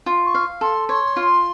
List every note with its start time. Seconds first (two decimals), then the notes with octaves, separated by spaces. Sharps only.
0.06 F4
0.25 C#6
0.35 F5
0.61 A4 C6
0.89 C#5 C6
1.17 F4